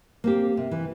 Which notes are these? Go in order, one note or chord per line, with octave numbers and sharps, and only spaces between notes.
A#3 C4 G4
C3
E3